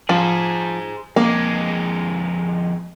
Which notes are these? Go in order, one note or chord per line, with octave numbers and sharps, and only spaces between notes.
F3 G#4 C5
F2 G#3 A#3